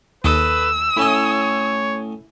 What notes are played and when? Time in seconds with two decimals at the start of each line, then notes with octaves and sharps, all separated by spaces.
0.24 D#2 A4 B4 D#5 E6
0.97 A2 C#4 E4 C#5 D#5